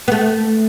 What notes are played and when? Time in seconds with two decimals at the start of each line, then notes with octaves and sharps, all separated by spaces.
0.08 B3
0.12 A3